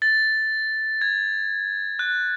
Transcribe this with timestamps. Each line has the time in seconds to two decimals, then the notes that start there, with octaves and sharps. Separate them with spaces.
0.02 A6
1.01 G#6
1.99 F#6